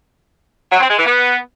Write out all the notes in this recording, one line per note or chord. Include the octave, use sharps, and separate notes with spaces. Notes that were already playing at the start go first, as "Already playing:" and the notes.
F#3
C4
G#3
E3
B3